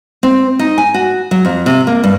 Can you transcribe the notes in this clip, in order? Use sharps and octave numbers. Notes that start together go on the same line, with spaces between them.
C4
D#4
G#5
F#4
F#3
F2
C3
A#3
G2